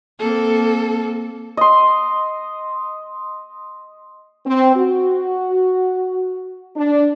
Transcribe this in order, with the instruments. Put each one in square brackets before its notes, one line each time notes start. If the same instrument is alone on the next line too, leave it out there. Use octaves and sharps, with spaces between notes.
[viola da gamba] A#3 C4 [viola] A4
[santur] D#5 C6
[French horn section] C4
F#4
D4